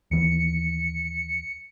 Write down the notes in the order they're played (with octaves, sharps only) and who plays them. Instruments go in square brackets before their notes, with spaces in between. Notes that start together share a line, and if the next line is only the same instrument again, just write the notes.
[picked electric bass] D#2 E3 [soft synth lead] C#7